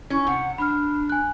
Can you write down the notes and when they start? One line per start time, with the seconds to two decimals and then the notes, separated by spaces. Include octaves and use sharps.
0.10 C#4 E4
0.27 C3 F#5
0.58 D4 B5 F6
1.09 G#5 F#6